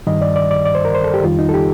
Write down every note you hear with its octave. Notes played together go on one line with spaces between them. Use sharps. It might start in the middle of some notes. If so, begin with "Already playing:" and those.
G2 D#3 G3 D#5
D5
D5
D5
D5
C5
A#4
C5
A4
G4
F2 D#3 G3 F4
D#4
A4
G4